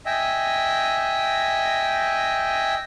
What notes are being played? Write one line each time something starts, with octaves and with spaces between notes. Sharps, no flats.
D#5 E5 G5 G#5